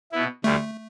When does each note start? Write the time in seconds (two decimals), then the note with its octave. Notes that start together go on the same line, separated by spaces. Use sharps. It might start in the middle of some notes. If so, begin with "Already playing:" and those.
0.12 B2 B3 E4
0.44 D2 D3 G3 A3